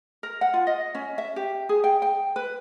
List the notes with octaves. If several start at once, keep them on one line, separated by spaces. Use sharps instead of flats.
A#4
F#5
F4
D#5
C#4
E5
G4
G#4
G5
G5
B4